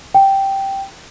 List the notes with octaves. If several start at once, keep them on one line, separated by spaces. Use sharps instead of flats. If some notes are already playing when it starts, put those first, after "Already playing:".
G5